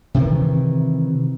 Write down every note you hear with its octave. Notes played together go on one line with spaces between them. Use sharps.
C3 D#3 E3